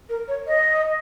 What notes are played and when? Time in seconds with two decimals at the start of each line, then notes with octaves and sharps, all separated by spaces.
0.09 A#4
0.28 C#5
0.47 D#5